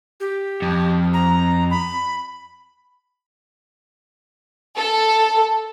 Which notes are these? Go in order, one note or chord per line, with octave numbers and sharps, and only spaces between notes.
G4
F2
A#5
B5
A4